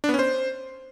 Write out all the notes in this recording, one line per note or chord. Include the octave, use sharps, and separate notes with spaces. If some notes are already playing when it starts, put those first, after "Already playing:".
D4
B3
C#4
C5